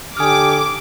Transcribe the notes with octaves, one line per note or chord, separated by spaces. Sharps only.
D3 G4 G#5 D6 D#6 F6